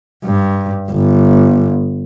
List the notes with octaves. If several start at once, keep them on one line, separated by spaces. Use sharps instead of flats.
G2
G1